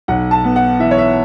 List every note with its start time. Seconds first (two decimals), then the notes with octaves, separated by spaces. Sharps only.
0.08 B1 F#5
0.31 A5
0.44 B3
0.56 F#5
0.79 E3 E5
0.91 C#5
0.98 E5